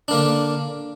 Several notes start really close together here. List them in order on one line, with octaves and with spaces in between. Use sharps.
D4 A#3 D3